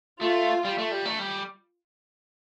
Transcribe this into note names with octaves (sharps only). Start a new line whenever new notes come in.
A3 F4
G3
A3
G3
A3
G3